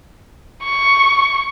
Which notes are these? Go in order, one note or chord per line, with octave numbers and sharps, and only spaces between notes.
C#6